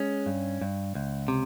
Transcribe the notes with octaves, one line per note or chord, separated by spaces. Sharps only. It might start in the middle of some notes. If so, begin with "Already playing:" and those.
Already playing: G#3 C#4
G2
G2
C#2
C3